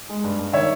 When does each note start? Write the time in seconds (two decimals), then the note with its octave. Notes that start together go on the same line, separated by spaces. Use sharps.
0.09 G#3
0.24 G2
0.39 G2
0.53 D#3 C#5 E5